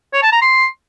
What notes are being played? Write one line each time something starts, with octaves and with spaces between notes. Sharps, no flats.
C#5
A5
A#5
C6